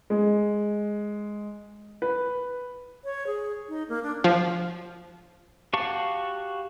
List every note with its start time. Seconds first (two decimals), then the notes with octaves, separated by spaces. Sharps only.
0.10 G#3
2.02 B4
3.04 C#5
3.27 G#4
3.69 D#4
3.89 A#3
4.03 D4
4.24 F3
5.73 F#4 G4 F5 A5 C#6